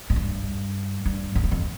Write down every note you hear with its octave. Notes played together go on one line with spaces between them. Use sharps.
G#2
G2
G2
G2
F#2
F2